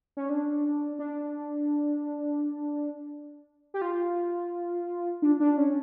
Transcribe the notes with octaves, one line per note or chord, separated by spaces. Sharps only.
C#4
D4
D4
G4
F4
D4
D4
C#4